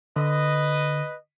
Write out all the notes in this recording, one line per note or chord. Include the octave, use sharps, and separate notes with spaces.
D3 B4 D#5